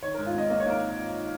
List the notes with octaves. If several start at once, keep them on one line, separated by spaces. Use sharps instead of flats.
D#3 C#5
G#2 A#4
F4
G#1 D#5
A#3 D#5
C#5
A#3 A#4